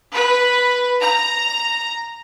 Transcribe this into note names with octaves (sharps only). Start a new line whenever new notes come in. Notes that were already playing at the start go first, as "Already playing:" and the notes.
B4
A#5